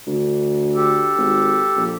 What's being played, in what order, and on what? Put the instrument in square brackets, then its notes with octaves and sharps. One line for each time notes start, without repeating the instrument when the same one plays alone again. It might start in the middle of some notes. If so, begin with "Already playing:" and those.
[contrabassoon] D2
[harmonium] G4 A4
[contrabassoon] G#1
A#1